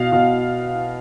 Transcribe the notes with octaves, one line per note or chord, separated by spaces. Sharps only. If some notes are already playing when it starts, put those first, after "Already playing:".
Already playing: B2 F5
B2